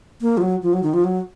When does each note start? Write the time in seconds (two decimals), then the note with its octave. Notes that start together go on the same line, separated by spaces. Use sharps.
0.21 A#3
0.37 F3
0.41 F#3
0.63 F3
0.73 F#3
0.83 D#3
0.94 F3
1.04 F#3